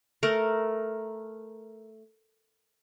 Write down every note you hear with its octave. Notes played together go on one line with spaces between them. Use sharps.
A3 A#4